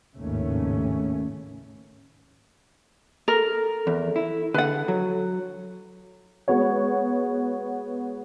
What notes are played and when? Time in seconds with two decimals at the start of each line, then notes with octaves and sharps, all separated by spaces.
0.17 G#1 D#2 A2 C#3 A3 C#4
3.28 A4 A#4
3.87 E2
4.16 E4
4.54 D3 B4 F#5
4.88 F#3
6.48 G#3 B3 F#4 C#5